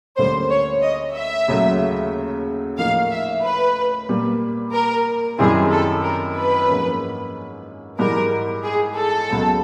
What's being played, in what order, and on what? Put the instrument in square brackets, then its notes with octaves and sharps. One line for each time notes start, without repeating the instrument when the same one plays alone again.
[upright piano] D2 D3 G3 A#3 C#4 [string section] C5
[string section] C#5
D#5
E5
[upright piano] D#2 C#3 F#3 A3
[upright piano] A2 F3 A#3 D#4 [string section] F5
[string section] E5
B4
[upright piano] A#2 G3 A#3
[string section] A#4
[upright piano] F#2 D#3 G3 C4 E4 [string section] G#4
[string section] A4
A#4
B4
[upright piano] G#2 F3 A#3 C#4
[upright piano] G#2 E3 G3 [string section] A#4
[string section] G#4
A4
[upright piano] C#2 B2 F#3